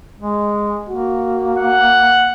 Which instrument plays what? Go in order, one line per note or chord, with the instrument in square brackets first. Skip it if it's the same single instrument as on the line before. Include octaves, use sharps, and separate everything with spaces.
[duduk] G#3
[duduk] A#3 [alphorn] F#4
[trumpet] F#5